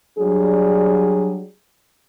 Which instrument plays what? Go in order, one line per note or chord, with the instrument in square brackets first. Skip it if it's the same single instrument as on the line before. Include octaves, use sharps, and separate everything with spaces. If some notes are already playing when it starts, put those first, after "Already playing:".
[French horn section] F#3 G3 D4 G#4